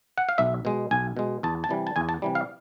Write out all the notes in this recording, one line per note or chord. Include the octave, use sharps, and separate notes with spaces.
F#5
F5
B1 E5
B2 G#3
B1 G#5
B2 G#3
E2 A5
A5
C3 E3 G3
A5
E2 G#5
A5
C3 E3 G3
F5